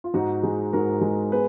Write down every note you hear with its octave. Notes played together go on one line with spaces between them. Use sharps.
F4
G#2 D#4 F#4
G#3
G#2 F#4 A#4
G#3
B3 G#4 B4